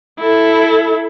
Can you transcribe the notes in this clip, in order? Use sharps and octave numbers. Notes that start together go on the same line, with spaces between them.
E4 A4